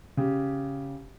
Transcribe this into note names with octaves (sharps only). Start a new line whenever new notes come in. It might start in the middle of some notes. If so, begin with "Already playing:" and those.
C#3 G4